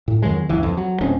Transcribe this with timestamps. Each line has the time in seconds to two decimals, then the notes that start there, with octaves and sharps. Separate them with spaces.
0.08 A2
0.22 F2 D#3 F#3 G#3
0.49 F#1 C#2 E3
0.63 F2
0.77 F#3
1.01 D1 D2 C4 C#4